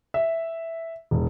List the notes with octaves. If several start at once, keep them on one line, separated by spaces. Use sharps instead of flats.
E5
E1